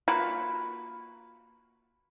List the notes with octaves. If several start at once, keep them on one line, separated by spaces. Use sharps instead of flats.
A#3 F4 F#4 B4